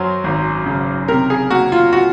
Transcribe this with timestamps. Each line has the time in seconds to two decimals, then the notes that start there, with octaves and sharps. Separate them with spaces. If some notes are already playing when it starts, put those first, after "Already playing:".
Already playing: F#2 F#3 C5
0.24 G#1
0.66 C#3
1.08 C3 A#4
1.30 G#4
1.50 A#3 F#4
1.72 F4
1.93 F#4